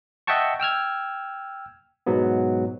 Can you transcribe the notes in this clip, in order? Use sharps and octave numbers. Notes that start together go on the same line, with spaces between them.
D#5 E5 F#5 G5 A5 C#6
G5 E6 F6 G#6
G#2 B2 F#3 G#3 B3